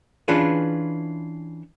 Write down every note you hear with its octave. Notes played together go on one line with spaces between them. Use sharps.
E3 C#4 D4 F4 G#4 B4